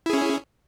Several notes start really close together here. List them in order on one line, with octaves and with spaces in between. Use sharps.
E4 G#4 C#4